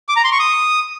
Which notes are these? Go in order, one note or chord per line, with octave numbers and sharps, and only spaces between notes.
D6
A#5
C6
C#6
D#6